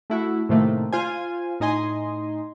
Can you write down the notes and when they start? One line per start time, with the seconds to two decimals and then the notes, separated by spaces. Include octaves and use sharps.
0.10 A3 E4 F#4
0.49 A2 C3 D#3 A3 A#3
0.93 F4 C5 G#5
1.60 A2 D#4 D#5 G#5 C6